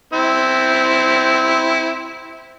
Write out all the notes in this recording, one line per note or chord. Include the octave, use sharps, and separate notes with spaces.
C4 E4